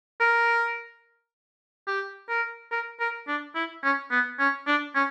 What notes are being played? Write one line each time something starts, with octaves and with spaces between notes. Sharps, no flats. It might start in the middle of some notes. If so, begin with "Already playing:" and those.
A#4
G4
A#4
A#4
A#4
D4
E4
C#4
B3
C#4
D4
C#4